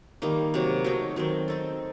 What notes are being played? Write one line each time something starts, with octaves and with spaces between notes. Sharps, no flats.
D#3 G3 A#3 D#4
C3 F#3 A#3
F#3 A3 D#4
D#3 F#3 C4
C4 D#4 A4